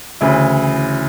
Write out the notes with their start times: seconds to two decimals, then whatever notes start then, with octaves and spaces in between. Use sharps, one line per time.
0.21 D2 C#3 E3 E4